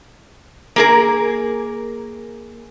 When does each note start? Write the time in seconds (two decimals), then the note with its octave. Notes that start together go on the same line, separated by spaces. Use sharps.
0.76 A#3 G#4 A#4